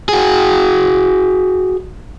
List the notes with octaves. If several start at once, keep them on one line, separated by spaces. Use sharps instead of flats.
F#4 G#4